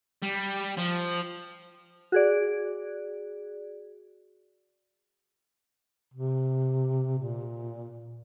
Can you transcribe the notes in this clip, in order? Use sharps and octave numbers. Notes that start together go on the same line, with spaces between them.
G3
F3
F#4 G#4 D5
C3
A#2